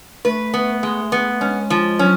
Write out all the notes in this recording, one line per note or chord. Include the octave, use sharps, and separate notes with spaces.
A3 B4
B3
G#3
B3
G#3 C#4
F3
F#3 C#4